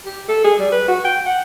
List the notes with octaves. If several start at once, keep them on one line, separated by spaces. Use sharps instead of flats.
G4
A4
G#4
G3
B4
F#4
G5
F#5